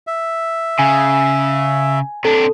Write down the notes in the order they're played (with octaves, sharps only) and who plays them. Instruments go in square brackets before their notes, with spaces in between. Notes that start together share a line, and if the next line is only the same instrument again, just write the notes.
[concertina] E5
[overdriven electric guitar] C#3 [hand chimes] G#5
[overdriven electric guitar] C3 D4 [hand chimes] A4